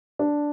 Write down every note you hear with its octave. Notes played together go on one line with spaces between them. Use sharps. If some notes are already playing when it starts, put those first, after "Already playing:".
D4